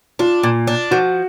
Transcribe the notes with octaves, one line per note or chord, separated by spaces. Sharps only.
D4 F4
A#2
D4
F3 F#4